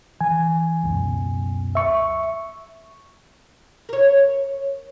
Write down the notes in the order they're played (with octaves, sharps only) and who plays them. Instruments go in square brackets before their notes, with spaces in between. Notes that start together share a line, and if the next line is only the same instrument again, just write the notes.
[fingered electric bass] E3 [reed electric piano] G#5
[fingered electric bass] C#2 F#2 B2
[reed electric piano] E5 C#6
[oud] A#4 C#5